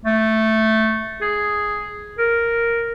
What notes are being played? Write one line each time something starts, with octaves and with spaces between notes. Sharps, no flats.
A3
G#4
A#4